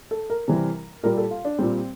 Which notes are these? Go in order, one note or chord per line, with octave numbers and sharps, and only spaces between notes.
A4
A#4
C3 E3 G3
A#2 G3 A#4
A4
F4
D4
A#2 G3 C4